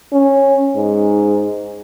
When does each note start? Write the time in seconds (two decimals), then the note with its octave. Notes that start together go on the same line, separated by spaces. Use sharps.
0.12 C#4
0.75 G#2